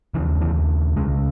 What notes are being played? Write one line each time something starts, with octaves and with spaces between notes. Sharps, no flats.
D#2 C#3 E3
E3
C#2 C#3 G#3